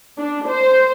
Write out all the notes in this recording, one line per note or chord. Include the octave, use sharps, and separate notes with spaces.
D4
C5